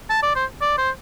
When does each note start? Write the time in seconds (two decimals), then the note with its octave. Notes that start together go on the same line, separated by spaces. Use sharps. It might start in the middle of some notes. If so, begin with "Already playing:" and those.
0.10 A5
0.23 D5
0.36 C5
0.61 D5
0.78 C5